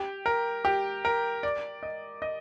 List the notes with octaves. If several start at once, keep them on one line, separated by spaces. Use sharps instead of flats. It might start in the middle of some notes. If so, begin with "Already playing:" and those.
Already playing: G4
A#4
G4
A#4
D5
D#5
D#5